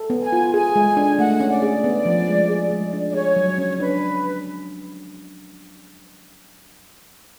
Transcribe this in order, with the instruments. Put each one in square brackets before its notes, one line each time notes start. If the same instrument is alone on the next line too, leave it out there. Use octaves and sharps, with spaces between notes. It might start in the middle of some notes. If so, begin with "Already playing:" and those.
Already playing: [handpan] A4
B3
[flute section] G#5
[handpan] F4
[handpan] G#4 [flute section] G#5
[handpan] G#3
D4
[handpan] A3 [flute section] F#5
[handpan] C#4
[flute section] D5
[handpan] G#4
B3
F3
G#3
G#4
G#3
D4
[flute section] D5
[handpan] G#4 [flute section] C#5
[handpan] F#3
C#4
[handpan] D4 [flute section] B4